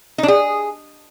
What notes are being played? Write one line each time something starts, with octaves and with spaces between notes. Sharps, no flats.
D#4
D4
G#4